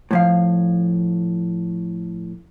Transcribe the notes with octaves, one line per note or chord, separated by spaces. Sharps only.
A2 F3 F5